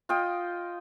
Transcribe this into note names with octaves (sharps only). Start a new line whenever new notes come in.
F4 D#5 G5